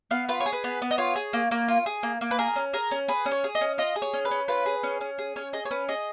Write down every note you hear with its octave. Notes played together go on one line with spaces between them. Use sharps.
B3 F5
F4 B4
C#5
G#4
B4
B3
B3
D#5
F4 C#5
G#4
A#3
A#3
F4
G#4
A#3
A#3
B4
G#4 A#4
C#4
G#4 A#4
C#4
G#4 B4
C#4
C#5
G#4
D#5
C#4
F4 D#5
G#4
C#5
C#4
B4
C#4
F4 B4
G#4
C#4
C#4
G#4
C#4 C#5
G#4 D#5
C#5
C#4 B4
G#4 D#5